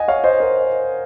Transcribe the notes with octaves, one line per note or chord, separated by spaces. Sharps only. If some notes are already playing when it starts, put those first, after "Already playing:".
Already playing: D#5 F#5 G#5
C#5 F5
C5 D#5
A#4